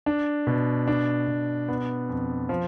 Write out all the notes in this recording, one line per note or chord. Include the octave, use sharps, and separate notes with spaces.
D4
B2
D4
B2
B3
F2
F3